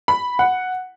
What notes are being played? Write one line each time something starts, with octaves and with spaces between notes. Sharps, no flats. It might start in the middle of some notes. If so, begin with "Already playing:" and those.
B5
F#5